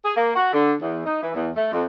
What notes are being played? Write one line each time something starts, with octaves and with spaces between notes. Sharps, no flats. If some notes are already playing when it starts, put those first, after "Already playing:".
G#4
A#3
F#4
D3
E2
D#4
E3
E2
A3
F2